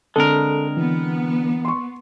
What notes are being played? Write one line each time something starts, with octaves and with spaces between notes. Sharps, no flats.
D3 G#3 C4 A4 A#4
E3 B3
C6 C#6